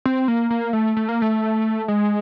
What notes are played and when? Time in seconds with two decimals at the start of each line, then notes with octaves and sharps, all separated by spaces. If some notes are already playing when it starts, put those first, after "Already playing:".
0.06 C4
0.28 A#3
0.51 A#3
0.73 A3
0.97 A3
1.09 A#3
1.22 A3
1.88 G#3